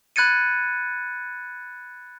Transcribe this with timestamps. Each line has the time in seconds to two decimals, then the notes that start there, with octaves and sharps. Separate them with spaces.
0.16 B5 F#6 G#6 A6 C#7 D#7